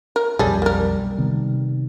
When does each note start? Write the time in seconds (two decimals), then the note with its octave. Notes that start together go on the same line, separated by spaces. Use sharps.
0.16 A#4
0.39 B1 F2 G3 G#4 A4
0.62 A#3 A#4
1.18 C3 D#3 B3